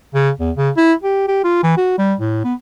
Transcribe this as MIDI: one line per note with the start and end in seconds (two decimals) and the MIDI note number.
0.14 0.30 49
0.40 0.51 40
0.56 0.70 49
0.77 0.93 64
1.03 1.25 67
1.28 1.44 67
1.44 1.60 65
1.63 1.73 52
1.77 1.95 66
1.98 2.14 55
2.20 2.42 45
2.44 2.54 59